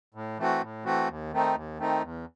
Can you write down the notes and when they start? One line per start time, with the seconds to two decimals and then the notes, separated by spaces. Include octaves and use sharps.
0.14 A2
0.38 E3 A3 C4 F#4
0.61 A2
0.85 E3 A3 C4 F#4
1.08 D#2
1.32 D#3 A3 C4 D#4
1.55 D#2
1.78 D#3 A3 C4 D#4
2.02 E2